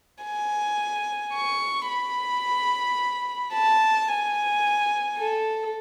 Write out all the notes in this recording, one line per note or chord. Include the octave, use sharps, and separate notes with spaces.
G#5
C#6
B5
A5
G#5
A4